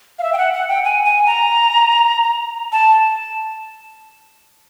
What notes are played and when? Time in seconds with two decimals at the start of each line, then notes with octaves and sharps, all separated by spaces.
0.19 F5
0.23 E5
0.33 G5
0.38 F#5
0.54 F#5
0.69 G5
0.84 G#5
1.05 G#5
1.26 A#5
2.72 A5